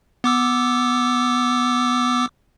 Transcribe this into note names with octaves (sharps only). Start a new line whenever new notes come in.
B3 D6 E6